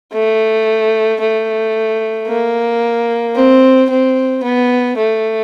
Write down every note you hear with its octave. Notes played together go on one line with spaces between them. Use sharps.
A3
A3
A#3
C4
C4
B3
A3